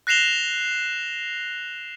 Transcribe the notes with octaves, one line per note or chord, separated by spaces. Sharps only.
F#6 A#6 C7 E7 F7 G7